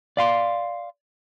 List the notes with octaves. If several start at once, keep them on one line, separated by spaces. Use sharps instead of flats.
D5 F5 C6